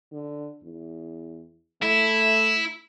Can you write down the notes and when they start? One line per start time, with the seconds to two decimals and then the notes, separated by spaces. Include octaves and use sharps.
0.13 D3
0.63 E2
1.82 A3 E4